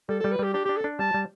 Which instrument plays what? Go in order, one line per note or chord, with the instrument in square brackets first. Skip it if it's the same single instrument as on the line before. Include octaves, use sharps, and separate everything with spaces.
[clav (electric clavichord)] G3 [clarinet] A4
[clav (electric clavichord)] G3 [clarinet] A4
[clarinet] B4
[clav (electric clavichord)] G3 [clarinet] G4
[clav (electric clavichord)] D4 [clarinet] G4
[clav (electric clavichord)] D4 [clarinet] G4
[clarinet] A4
[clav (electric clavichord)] D4
[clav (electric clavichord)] G3 [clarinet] A5
[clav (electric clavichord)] G3